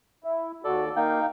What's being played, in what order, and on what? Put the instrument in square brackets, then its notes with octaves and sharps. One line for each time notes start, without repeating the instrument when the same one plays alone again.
[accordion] E4
[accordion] D#2 [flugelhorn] F#4 [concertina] A4 D5
[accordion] A#3 [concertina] D#4 G5 [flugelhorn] F5